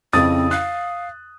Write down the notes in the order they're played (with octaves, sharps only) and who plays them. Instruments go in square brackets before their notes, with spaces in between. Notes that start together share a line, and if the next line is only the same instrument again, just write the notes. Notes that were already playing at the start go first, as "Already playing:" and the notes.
[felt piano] F2 C#3 E4 [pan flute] C4 [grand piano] D#6 A6
[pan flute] F5 [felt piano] F#6